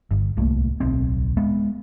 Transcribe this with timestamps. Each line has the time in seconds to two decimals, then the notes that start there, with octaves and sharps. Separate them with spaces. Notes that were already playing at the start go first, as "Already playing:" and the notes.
0.11 G1
0.37 D1 C2 A3 A#3
0.80 D1 B1 C4
1.37 G#3 B3